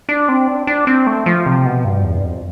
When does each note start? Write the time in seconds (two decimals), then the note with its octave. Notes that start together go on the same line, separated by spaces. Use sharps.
0.09 D4
0.29 C4
0.48 D4
0.67 D4
0.87 C4
1.07 A3
1.26 F3
1.46 C3
1.65 B2
1.85 G2
2.04 E2
2.18 G2
2.24 F2